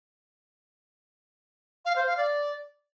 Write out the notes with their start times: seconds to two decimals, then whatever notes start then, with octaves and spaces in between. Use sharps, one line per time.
1.85 F5
1.96 C5
2.07 F5
2.17 D5